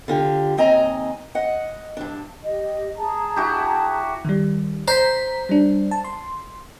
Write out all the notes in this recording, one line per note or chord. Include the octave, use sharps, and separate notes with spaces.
D3 F4 G4
D#2 C4 D#5 G#5 A#5
D#5 F#5
G2 D4
G4 D#5
G#4 A5 A#5
E4 F#4 G4
D#3 G3
C5 A#5 G6 B6
G3 D4
A5
C6